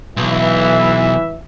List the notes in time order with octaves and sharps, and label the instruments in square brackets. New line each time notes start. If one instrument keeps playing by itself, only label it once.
[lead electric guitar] B1 [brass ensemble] E3 [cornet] E5